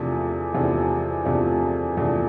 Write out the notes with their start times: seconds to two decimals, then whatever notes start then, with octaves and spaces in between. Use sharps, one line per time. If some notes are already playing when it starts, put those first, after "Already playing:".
Already playing: E2 C3 F3 A3 D4
0.54 E2 C3 F3 A3 D4
1.25 E2 C3 F3 A3 D4
1.97 E2 C3 F3 A3 D4